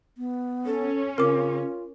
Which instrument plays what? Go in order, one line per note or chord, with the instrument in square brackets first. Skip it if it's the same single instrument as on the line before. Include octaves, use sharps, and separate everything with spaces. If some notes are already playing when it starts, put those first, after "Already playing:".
[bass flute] B3
[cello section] C#4 [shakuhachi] A4
[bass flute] C#3 [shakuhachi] F4 [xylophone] A#4 D6